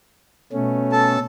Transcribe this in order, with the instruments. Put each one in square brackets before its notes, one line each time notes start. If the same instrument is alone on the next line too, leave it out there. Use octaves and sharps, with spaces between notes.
[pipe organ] B2 A3 C#4
[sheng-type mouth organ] A4 A5